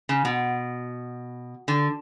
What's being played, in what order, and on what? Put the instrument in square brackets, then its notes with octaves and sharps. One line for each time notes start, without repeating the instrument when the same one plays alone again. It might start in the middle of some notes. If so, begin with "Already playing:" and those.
[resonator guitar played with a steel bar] C#3
B2
D3